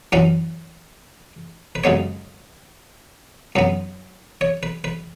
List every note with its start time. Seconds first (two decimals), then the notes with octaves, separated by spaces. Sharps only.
0.12 F#2 E3 C#4 F#5
1.75 B4
1.84 F#2 C#3 G#3 B3 C#5
3.56 F#2 F#3 B3
4.41 C#5
4.63 B4
4.84 B4